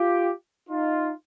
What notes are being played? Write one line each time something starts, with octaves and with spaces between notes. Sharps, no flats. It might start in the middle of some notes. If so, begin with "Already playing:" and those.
Already playing: F4 G4
D#4 F4